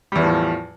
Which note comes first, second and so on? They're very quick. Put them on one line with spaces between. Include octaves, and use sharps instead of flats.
G3 E2 E3 A2 F3